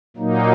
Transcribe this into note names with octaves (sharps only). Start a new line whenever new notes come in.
A#2 F#3 A#3 D#4